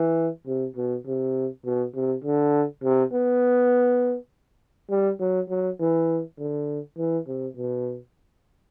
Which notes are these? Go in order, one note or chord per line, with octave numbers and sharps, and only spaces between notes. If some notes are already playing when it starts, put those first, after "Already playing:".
Already playing: E3
C3
B2
C3
B2
C3
D3
C3
B3
G3
F#3
F#3
E3
D3
E3
C3
B2